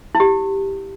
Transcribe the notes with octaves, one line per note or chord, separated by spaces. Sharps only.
E4
G4